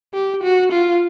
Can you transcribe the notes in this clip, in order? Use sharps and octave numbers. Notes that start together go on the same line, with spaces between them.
G4
F#4
F4